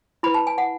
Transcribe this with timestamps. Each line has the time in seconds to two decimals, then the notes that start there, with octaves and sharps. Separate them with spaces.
0.23 E4 B4 B5
0.34 A5
0.47 G#5
0.58 F#5